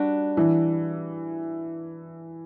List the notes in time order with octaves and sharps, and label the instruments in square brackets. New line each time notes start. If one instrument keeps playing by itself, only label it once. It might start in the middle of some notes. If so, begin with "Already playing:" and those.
Already playing: [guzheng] G3 D4 F#4
[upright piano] E3